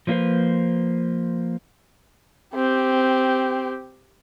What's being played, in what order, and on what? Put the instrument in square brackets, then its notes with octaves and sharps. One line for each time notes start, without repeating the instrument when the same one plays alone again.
[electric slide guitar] F3 F#3 A#3 G4 B4 C5
[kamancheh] C4 G4